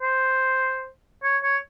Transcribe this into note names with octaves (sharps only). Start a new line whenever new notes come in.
C5
C#5
C#5